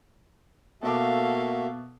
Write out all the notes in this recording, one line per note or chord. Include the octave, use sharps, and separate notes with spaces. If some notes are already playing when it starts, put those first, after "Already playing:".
B2 A#3 F#4 A4 E5 F5 A5 D6